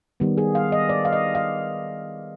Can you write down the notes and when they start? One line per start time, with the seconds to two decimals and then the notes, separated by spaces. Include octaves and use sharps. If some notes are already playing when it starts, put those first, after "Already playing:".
0.20 D#3 G3 B3
0.38 G#4
0.55 F5
0.72 D#5
0.89 D5
1.05 F5
1.13 D#5
1.35 F5